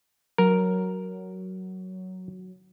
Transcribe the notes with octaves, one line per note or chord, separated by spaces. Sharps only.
F#3 A#4